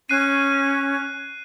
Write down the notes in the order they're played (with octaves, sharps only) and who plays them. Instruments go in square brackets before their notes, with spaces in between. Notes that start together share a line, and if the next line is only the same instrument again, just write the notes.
[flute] C#4 [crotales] F#6 C7 D#7